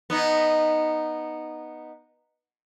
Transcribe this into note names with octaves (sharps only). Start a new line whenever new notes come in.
B3 D#4